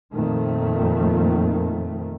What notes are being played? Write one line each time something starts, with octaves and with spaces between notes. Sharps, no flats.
F2 A#2 D#3 A3